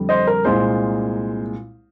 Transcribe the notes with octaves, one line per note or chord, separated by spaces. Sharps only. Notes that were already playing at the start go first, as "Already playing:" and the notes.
Already playing: F2 D3 G3
C5 D#5
A#4
C2 A#2 G#3 C5